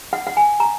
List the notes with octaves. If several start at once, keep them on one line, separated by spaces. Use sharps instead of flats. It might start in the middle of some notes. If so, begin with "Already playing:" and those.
F#5
F#5
G#5
A#5